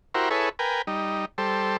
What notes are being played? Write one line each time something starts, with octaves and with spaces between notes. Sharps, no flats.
E4 F#4 G4 A#4 C5
E4 G#4 A4 B4 C#5
A#4 B4 G5 G#5
G3 D#4
G3 A4 C5